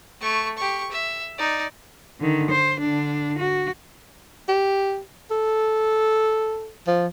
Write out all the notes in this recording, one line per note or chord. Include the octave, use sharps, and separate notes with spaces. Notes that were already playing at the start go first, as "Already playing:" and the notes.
A3 C#6
G4 C#6
E5
D#4 D5
D3 D#3
C5
D3 D4
F#4
G4
A4
F3